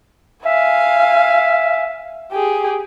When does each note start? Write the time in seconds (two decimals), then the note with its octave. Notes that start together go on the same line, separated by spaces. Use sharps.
0.46 E5 F5 G#5
2.32 G4 G#4